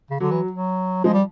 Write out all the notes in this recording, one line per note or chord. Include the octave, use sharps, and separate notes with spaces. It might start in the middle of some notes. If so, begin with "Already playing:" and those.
C#3
D3 F#3
E3
F#3
F3 G#3
G3